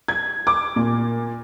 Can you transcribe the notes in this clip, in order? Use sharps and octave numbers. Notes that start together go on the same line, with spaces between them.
G#6
D6
A#2